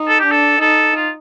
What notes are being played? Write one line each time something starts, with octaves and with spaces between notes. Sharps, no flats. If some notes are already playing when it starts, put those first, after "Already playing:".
Already playing: D#4
A4
G4
D4
A4
D#4 A4
F4